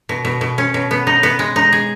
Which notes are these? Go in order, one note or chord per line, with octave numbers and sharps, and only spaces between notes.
B2
B2
B2
C#4
B2
B3
D#4
B3
G#3
D#4
G#4